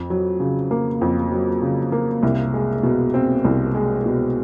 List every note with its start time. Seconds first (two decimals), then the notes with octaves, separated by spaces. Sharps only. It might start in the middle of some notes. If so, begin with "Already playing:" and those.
Already playing: F2
0.10 F#3
0.40 C#3
0.71 A#3
1.01 F2
1.32 F#3
1.62 C#3
1.92 A#3
2.23 C2
2.54 G#3
2.83 B2
3.14 C4
3.45 C2
3.75 G#3
4.06 B2